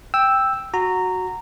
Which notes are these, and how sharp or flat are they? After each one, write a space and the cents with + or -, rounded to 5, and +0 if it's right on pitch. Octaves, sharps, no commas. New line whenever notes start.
G5 +5 E6 +0
F#4 -5 A#5 -15